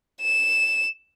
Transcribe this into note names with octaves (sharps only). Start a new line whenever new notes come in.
E7